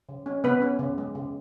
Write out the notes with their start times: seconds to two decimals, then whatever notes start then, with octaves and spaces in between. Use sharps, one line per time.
0.09 C#3
0.26 C#4
0.44 C#3 B3 B4
0.62 C#4
0.79 C#3
0.98 G#3
1.15 C#3